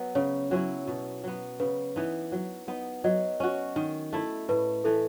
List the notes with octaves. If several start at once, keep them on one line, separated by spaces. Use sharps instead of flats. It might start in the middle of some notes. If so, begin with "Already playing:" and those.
Already playing: F#3 B3
C#3 C#5
F#3 C#4 E4
B2
F#3 B3
C#3 B4
E3 B3 D#4
F#3
B3 D#4
F#3 D#5
C#4 F#4
D#3
A3 E4
A2 B4
E3 A3 A4